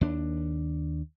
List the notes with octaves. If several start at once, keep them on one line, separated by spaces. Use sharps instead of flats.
D#2 D4